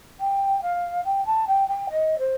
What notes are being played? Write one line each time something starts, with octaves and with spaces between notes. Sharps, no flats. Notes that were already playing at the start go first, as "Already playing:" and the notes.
G5
F5
G5
A5
G5
G5
D#5
C5